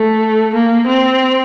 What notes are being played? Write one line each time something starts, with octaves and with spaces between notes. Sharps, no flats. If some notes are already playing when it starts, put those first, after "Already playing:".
Already playing: A3
A#3
C4